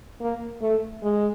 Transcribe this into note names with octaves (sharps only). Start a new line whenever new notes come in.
A#3
A3
G#3